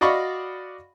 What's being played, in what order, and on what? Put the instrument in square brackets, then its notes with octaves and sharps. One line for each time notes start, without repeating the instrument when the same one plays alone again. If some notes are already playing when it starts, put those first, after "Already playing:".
[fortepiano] F#4 D5 D#5 F5 B5 C#6